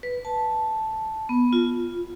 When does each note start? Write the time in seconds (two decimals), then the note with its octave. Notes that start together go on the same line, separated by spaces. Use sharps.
0.03 B4
0.25 A5
1.29 B3
1.53 F4